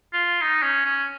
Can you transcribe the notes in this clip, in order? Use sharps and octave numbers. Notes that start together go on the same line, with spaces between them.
F4
D#4
C#4
C#4